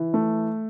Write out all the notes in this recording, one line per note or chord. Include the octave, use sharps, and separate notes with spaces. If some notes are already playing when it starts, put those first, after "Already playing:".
Already playing: E3
A3